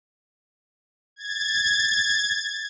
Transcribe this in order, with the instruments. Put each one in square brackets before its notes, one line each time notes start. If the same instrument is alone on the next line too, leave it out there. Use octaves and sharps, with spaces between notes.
[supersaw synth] G#6 A6